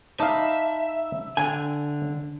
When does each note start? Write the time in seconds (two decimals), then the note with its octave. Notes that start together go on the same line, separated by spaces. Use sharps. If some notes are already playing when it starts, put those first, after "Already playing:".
0.20 D#4 E5 F5 A5 B5 D6
1.37 D3 G5 G#5